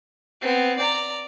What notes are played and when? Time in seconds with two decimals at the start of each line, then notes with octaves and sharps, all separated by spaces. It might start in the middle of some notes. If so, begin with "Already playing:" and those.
0.41 B3 C4
0.78 D5 A#5